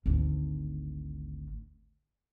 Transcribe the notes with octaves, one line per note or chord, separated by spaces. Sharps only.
G#1 D2